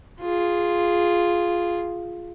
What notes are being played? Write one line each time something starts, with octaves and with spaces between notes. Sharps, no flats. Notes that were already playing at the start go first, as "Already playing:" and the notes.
F4 G#4